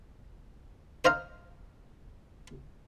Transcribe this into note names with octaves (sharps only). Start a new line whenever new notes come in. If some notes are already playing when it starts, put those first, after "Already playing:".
C5 D#5 F5 A#5